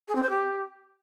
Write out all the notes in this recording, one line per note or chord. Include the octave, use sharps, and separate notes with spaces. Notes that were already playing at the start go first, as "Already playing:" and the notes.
G#4
C4
C5
G4